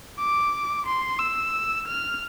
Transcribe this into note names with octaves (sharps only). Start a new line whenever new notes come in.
D6
C6
E6
F6